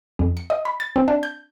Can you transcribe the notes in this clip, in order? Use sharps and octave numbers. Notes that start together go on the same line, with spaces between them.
F2
C#7
D#5
B5
A6
C4
D4
G6